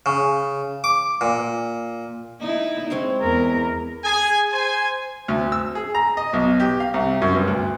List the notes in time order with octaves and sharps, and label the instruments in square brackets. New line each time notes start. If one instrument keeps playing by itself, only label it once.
[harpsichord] C#3
D6
A#2
[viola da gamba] D#4 E4
[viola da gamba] G#3 [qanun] C4 C#5 C6
[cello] E2 A#4
[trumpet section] G#4 G#5
C5 G#5
[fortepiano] D2
E6
G#4
A#5
D#5
B1
G4
F5
C2
F#2
G2
D2